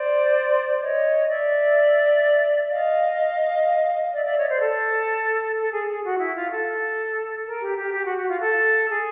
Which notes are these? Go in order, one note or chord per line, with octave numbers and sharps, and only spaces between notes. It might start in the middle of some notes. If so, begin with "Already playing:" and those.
Already playing: C5 D5
C#5 D#5
D5 E5
D#5 F5
D5 E5
D5 E5
C#5 D#5
C5 D5
A4
A4
G#4
G#4
F#4
E4
F4
A4
A#4
G4
G4
G4
F#4
F#4
F4
A4
G#4